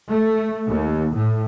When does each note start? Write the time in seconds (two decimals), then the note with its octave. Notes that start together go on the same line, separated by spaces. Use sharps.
0.12 A3
0.67 D#2
1.15 A2